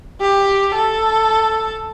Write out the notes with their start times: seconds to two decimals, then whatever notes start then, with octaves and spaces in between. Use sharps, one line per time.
0.21 G4
0.75 A4